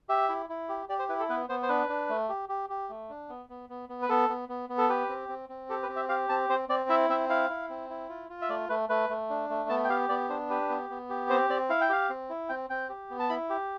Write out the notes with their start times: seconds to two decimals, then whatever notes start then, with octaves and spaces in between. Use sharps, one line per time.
0.09 G4 E5
0.29 E4
0.49 E4
0.69 G4
0.89 G4 D5
0.99 C5
1.09 E4 B4
1.19 A4
1.29 B3 B4
1.49 B3 C5
1.63 C5
1.69 D4 B4
1.89 D4
2.09 A3
2.29 G4
2.49 G4
2.70 G4
2.89 A3
3.09 D4
3.29 B3
3.49 B3
3.69 B3
3.89 B3
4.02 B4
4.09 B3 A4
4.29 B3
4.49 B3
4.69 B3
4.78 A4
4.89 G4 B4
5.09 C4
5.29 C4
5.49 C4
5.70 G4 A4
5.83 B4
5.89 C4
5.96 E5
6.09 G4 F5
6.29 C4 A5
6.49 C4 C5
6.69 C4 D5
6.89 E4 E5
7.10 C4 E5
7.29 E4 F5
7.50 E4
7.69 C4
7.90 E4
8.09 F4
8.30 F4
8.42 E5
8.49 A3 D5
8.69 A3 B4
8.89 A3 B4
9.09 A3
9.30 D4
9.50 A3
9.69 B3 A5
9.84 G5
9.90 G4 F5
10.09 B3 D5
10.29 D4 C5
10.50 G4 B4
10.69 B3
10.90 B3
11.10 G4
11.30 C4 C5
11.50 C4 D5
11.69 E4 F5
11.81 G5
11.90 G4 F5
12.10 C4
12.29 E4
12.49 C4 G5
12.70 C4 G5
12.89 G4
13.10 B3
13.19 A5
13.29 E4 B5
13.50 G4